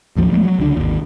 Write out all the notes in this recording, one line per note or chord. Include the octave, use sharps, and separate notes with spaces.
A1 D#2 F3 F#3
F3 G#3 A3 B3
F#3
C#2 D3
G#1 D#2